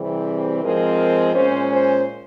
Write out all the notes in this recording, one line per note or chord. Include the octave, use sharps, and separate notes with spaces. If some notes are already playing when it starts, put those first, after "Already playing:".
Already playing: C3 E3 G3 C4 G#4
G#2 F3 G#3 C4 A#4
A#2 G#3 C#4 C5
C5